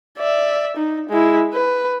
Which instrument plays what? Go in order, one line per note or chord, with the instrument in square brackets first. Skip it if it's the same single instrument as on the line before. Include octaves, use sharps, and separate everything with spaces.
[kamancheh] D5 E5
D#4
G#3 E4
B4